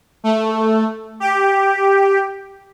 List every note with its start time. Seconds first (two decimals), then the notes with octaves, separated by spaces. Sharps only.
0.24 A3
1.20 G4